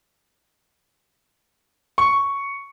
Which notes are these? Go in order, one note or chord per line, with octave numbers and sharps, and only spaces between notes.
C#6